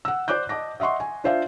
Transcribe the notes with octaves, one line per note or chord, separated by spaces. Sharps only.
F#5 E6
C5 D5 D6 F#6 G6
D#5 A5 D6 A#6
D#5 E5 F#5 C6 C#6
G#5
D4 F4 C5 D5 E5 F5